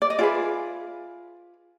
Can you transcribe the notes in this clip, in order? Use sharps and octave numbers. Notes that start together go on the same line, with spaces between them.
D5
D#5
F4 G#4 B4 D5 E5